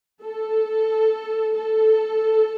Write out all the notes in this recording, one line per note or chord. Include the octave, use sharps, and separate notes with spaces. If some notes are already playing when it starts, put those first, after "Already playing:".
A4
A4